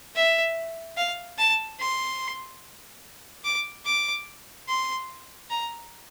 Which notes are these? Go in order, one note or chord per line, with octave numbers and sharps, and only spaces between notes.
E5
F5
A5
C6
D6
D6
C6
A#5